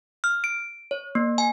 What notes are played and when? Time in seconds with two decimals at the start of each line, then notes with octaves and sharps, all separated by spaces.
0.24 F6
0.44 D7
0.91 C#5
1.15 A#3
1.38 G#5